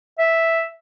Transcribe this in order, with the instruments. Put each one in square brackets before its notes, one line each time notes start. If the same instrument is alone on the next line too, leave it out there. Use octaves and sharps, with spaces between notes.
[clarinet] E5